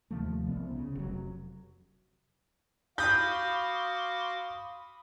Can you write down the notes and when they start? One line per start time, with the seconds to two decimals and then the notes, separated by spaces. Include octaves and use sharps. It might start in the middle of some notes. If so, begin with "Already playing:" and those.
0.11 D#2 C3 F3 A3
0.47 C2 B3
0.71 C#3
0.95 F1 F#3
2.98 F#4 F5 B5 C6 D6 D#6 G6